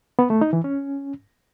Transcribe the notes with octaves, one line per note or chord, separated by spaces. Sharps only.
B3
A3
D#4
E3
C#4